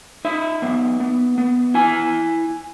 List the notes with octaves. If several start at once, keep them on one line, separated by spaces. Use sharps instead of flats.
D#4 E5
B3
B3
B3
E4 G#5